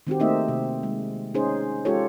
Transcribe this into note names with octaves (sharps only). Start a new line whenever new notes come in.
D#3 C4 F#4 G4
A3 A#3 C4 D#4 D#5 E5
C3
G#3
C#4 D#4 G#4 C5
G#3 C#4 F4 G4 A4 C#5